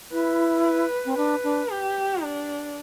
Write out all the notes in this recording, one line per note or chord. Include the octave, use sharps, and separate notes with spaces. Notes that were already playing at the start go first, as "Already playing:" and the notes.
E4 B4
B4
C4
D4 B4
D4
G4
D4